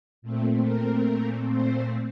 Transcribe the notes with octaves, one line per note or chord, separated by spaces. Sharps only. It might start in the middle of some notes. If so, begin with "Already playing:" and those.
A#2 A3 C4
A#4
A#2 A3 C4
C5